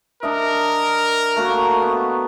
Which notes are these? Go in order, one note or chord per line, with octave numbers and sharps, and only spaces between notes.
D4 A#4 D#5 E5
A3 A#3 F#4
B3